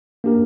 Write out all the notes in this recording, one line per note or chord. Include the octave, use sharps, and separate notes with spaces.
A#3 D4 G4 A#4